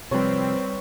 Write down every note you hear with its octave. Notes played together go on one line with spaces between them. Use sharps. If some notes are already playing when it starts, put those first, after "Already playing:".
C3 F3 G3 C4 B4 C#5